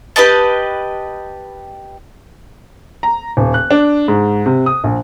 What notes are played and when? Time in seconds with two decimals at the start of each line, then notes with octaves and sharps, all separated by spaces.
0.16 G4 B4 D#5 A5
3.03 A#5
3.37 D#1
3.54 F#6
3.71 D4
4.08 G#2
4.46 C3
4.66 D#6
4.84 A#1